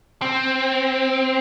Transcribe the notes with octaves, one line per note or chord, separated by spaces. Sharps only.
C4